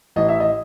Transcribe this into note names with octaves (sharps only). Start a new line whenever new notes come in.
A1 D#5
E5
D#5